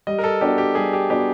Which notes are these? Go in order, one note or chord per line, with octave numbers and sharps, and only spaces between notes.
G3 D#5
A#4
A4
B3 D4 F#4 G4
G4
G3 G#4
G4
B3 D4 F#4 G4